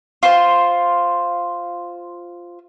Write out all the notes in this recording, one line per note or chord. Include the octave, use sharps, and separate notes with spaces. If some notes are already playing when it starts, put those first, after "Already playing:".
F4 C5